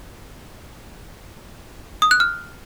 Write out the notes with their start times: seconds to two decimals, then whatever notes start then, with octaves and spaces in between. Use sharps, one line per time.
2.02 D#6
2.11 F#6
2.20 F6